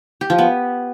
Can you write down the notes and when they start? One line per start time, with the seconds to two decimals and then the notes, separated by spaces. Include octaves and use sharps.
0.21 G4
0.30 F3
0.38 B3